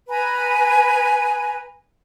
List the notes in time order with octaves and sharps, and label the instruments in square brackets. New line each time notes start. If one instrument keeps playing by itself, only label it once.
[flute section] B4 G#5 A#5 B5